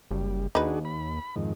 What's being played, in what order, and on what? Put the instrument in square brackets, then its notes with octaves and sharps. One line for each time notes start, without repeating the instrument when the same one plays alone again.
[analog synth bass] F#1 [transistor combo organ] G3
[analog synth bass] D#2 [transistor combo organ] D4 F#4 G#4 [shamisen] D#4 B4
[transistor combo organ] B5
F2 G#2 D#3